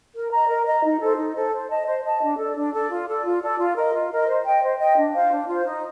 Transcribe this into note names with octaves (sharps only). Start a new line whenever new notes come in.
A#4
D#5 A#5
A#4
D#5 A#5
D#4
A4 C5
D#4
A4 C5
C5
D#5 A5
C5
D#5 A5
D4
A4 D5
D4
A4 D5
F4
A4 D5
F4
A4 D5
F4
A#4 D#5
F4
A#4 D#5
C5
D#5 G5
C5
D#5 G5
D4
F4 C5 F5
D4
F4 C5 F5
D#4